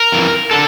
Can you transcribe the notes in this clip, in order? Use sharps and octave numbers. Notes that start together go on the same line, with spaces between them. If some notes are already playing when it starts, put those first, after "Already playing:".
Already playing: A#4
F2 E3
D3 A4